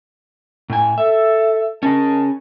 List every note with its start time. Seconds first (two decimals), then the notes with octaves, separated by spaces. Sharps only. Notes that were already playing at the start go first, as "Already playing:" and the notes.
0.70 A2 G#5
0.98 A4 E5
1.83 C#4 G#4 A#4 D#5 A5